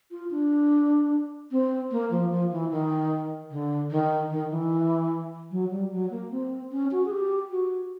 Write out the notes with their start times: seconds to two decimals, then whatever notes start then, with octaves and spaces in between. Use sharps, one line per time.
0.11 F4
0.31 D4
1.51 C4
1.91 A#3
2.11 F3
2.31 F3
2.51 E3
2.71 D#3
3.51 D3
3.91 D#3
4.31 D#3
4.51 E3
5.51 F#3
5.71 G3
5.92 F#3
6.10 A#3
6.31 C4
6.72 C#4
6.92 F#4
7.05 G#4
7.11 G4
7.51 F#4